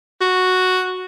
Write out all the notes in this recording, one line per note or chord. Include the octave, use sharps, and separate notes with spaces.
F#4